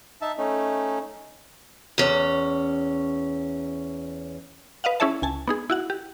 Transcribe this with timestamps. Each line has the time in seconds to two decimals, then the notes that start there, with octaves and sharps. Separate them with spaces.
0.22 D#4 E5 A5
0.38 A3 C#4 D#4
1.98 E2 C#4
4.84 B4 D#5 F5 F#5
5.00 C#4 E4 G#4 C#5 E5 A5
5.22 C#2 G#5 A5
5.48 B3 D#4 G#4
5.70 E4 F#4 F#5
5.90 G4